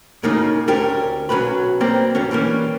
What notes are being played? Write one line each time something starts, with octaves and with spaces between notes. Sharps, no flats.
F#2 A2 C#3 A#3 D#4
D2 C#4 D4 G4 A#4
B1 F#3 A#3 C#4 B4 B5
G3 A#3 C4 G4 D5
B1 G2 D3 C#4
E3 G3 A#3 C#4